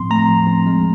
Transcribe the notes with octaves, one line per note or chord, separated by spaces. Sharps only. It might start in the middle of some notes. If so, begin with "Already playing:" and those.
Already playing: A2 F3 C4 C6
A3 A#5
F3
C4
G#3